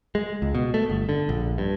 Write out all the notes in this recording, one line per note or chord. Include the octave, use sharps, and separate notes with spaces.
G#3
C#2
B2
A3
G1
D3
A#1
G2